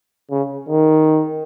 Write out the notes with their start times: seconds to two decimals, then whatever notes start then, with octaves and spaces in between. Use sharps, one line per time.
0.31 C#3
0.69 D#3